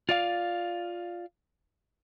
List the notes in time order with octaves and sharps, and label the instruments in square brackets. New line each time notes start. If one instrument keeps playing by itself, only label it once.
[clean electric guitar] F4 D5 F5